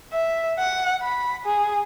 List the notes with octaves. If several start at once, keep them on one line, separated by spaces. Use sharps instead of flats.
E5
F#5
B5
G#4